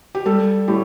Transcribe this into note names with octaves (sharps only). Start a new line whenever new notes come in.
G4
G3 A4
A2 G4